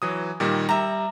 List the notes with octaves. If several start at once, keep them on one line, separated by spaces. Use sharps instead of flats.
E3 F#3 D#6
A#2 D#3 G3
G3 E5 A#5